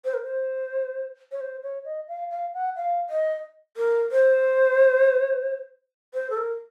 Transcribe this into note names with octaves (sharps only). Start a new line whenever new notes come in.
C5
A#4
C5
C#5
C5
C#5
D#5
F5
F5
F#5
F5
D#5
A#4
C5
C5
A4
A#4